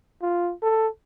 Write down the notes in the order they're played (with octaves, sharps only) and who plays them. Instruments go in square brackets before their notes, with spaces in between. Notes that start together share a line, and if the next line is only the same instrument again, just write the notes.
[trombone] F4
A4